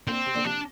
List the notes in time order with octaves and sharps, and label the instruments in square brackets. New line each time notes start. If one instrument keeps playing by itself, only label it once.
[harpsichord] A#2 D3 [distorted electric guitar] C4
[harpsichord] C3
A#2 D3
[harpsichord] C3 F3 [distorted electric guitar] D4